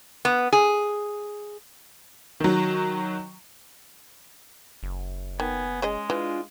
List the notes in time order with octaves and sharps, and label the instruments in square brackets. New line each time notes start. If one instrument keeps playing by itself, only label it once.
[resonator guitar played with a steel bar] B3
G#4
[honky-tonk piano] D#3 F#3
[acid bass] F#1
[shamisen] D#3 [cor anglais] B3 [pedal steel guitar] G#5
[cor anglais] G#3 [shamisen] C#4 G#4 D#5
[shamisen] E3 [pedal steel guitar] D4 F4